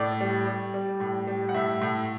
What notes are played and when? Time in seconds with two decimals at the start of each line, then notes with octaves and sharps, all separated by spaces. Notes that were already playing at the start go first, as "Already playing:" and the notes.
Already playing: A2 D5
0.21 G3
0.47 G3
0.74 G3
1.00 A2
1.27 G3
1.49 F#5
1.54 A2 E5
1.81 A2